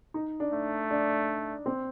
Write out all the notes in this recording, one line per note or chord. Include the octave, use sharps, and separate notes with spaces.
D#4
D4
A3
D4
C4